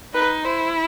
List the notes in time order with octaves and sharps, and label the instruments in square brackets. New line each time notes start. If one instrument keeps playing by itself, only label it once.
[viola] D#4 [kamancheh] B4
[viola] E4 [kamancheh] C5